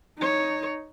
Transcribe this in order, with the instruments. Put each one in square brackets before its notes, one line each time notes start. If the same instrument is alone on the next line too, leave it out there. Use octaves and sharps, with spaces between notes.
[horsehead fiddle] D#4 C#5